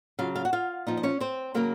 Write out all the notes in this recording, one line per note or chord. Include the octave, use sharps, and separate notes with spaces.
C#3 F#3 F4 F5
F4 F5
F#4 F#5
F4 F5
A#2 F3 D#4 D#5
D#5
C#4 C#5
C4 C5
C#3 F#3 A#3 A#4